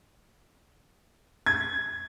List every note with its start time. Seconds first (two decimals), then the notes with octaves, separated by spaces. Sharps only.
1.46 G#6